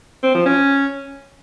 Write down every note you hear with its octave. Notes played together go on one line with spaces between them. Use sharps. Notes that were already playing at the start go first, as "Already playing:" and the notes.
C4
F3
C#4